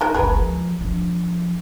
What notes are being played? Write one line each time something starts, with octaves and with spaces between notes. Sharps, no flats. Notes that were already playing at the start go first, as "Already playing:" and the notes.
D#3 G#3 A#4
F#1 C#2 G#4 A#4 B4
F3
F3 D4